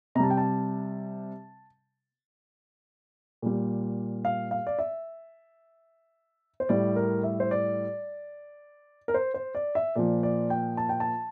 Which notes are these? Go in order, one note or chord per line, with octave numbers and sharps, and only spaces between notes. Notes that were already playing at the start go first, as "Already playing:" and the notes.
C3 G3 A5 A#5
G5
A5
A#2 G3
F5
F5
D5
E5
C5
A2 G3 D5
A#4
E5
C5
D5
A#4
C5
C5
D5
E5
A#2 F3 D5
D5
G5
A5
G5
A5